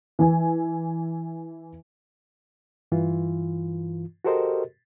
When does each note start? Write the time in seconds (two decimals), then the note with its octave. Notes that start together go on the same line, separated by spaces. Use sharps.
0.19 E3 G#5
2.92 G2 E3 F4
4.25 F#4 G4 A4 A#4 C5 D#5